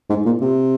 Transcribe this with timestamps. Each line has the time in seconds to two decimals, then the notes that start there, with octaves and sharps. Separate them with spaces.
0.09 G#2
0.25 A#2
0.41 C3